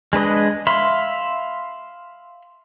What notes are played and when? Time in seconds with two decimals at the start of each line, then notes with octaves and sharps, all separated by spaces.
0.13 G#3 D4 B4 D#5
0.67 E5 F5 B5 C6